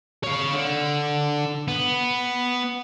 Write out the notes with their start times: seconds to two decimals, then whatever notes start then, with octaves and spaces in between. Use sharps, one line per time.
0.24 C#5 F5
0.53 D3
1.68 B3